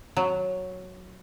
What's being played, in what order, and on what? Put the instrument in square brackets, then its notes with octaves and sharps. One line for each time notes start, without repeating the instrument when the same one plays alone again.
[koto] F#3